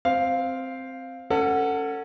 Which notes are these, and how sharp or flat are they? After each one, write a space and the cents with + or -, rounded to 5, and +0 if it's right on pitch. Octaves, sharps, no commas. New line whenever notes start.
C4 +0 F5 +5
C#4 +0 A4 +30 F#5 +0